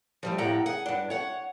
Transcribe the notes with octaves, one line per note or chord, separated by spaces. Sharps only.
F3 G3 A3
F2 A2 G4 F#5 A#5
G#4 F#5
G2 D4
C#5 F#5